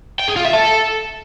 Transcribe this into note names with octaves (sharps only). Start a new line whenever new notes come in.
G5
G#4
F4
E5
A4